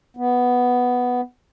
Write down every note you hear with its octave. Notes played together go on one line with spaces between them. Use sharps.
B3